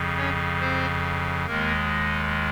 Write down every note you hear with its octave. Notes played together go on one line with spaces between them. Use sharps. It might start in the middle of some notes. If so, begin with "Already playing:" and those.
Already playing: F2 C#3 F3
C#4 C#5
C4 C5
D#2 D#3 G#3 A#3 A#4